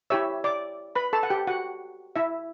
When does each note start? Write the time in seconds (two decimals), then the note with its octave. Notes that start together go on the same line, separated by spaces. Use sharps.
0.10 E4 G4 C#5 E5 E6
0.44 D5 D6
0.95 B4 B5
1.13 A4 A5
1.23 F#5
1.30 G4 G5
1.47 F#4 F#5
2.16 E4 E5